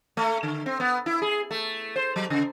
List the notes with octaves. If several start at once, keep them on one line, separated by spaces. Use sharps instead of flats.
A3
D3
C4
B3
E4
G#4
A3
C5
F#3
C#3